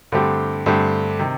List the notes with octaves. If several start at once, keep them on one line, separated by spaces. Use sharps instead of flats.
G2 D3 A3 C4 G4
G2 D3 A3 C4 G4
C3 D#3